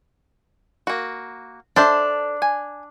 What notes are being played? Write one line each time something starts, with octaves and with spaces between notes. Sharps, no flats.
A#3 F#4
D4 A4 C5 E5
G#5